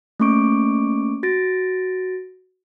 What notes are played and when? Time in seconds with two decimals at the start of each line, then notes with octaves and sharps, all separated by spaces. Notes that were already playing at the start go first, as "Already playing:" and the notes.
0.20 A3 A#3 C#4 C#6 D6 D7
1.23 F#4 A6 A#6 D7